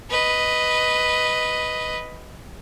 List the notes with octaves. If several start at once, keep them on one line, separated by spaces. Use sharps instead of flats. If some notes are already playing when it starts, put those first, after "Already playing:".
B4 D#5